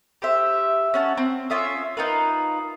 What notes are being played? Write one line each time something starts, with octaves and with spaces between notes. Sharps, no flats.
G4 C5 E5
C#4 F#5 A5
C4
C#4 F4 E5 D#6
D#4 F4 A#4 B4